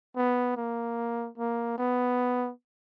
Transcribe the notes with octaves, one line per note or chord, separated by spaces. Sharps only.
B3
A#3
A#3
B3